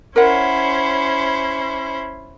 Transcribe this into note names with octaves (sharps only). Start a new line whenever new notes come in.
C#4 E4 A#4 C5 C#5 F#5